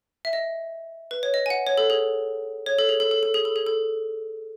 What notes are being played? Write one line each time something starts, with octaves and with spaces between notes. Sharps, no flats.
E5
D#5
B4
C#5
D#5
G#5
F#5
C#5
A4
G#4
C#5
A4
G#4
A4
A4
A4
G#4
A4
G#4
A4